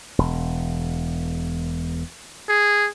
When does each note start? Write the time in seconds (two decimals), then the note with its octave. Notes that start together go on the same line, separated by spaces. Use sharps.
0.18 E1
2.49 G#4